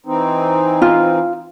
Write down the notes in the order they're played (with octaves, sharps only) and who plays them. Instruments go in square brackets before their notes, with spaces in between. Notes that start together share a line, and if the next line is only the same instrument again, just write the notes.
[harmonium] E3 C4 D#4
[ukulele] F4